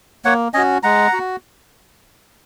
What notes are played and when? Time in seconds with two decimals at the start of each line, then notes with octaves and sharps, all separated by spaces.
0.25 A#3 C#5 F#5
0.54 C#4 F#4 D#5 G#5
0.83 G#3 F#5 A#5
1.13 F#4